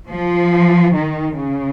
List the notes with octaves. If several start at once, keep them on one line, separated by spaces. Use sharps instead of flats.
F3
D#3
C#3